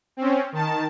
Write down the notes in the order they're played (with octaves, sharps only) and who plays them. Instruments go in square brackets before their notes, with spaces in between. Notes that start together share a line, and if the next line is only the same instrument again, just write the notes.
[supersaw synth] C4 C#4
D#3 A5